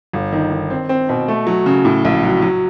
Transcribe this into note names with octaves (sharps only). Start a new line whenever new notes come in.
G1
D#3
D#3
C4
C4
B2
A3
F#3
C#3
A2
A#1
F#3
F#3